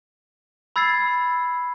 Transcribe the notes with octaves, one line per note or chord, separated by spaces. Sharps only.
B5 E6 G#6 A6 C7